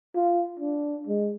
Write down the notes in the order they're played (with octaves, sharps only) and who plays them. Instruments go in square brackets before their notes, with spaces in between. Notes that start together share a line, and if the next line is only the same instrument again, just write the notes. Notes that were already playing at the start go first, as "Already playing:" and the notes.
[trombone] F4
D4
G#3